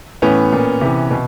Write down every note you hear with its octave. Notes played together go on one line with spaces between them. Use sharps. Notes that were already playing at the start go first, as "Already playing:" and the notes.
A2 E3 B3 C#4
A#2
C3 E3
B2